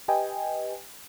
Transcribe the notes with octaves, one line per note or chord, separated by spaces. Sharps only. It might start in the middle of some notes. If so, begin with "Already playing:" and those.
G4 B4 D#5 G5 G#5